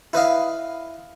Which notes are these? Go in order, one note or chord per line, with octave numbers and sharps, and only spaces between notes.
E4 B4 D#5 F5